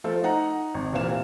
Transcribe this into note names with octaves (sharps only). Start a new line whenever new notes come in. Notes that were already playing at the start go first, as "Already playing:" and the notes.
F3 A3 F4 A4
D#4 F#5 A#5
G#1
F1 A#2 E3 C5 F5 E7